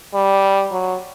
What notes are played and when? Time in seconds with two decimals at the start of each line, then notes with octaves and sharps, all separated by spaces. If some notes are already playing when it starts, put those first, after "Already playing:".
0.14 G3
0.72 F#3